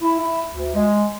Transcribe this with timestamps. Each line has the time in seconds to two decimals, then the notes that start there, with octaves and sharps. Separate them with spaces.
0.01 E4
0.20 E4
0.53 D2
0.75 G#3